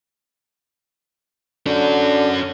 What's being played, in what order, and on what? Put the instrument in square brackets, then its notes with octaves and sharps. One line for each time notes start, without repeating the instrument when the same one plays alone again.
[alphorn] D3 [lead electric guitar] C#4 F#4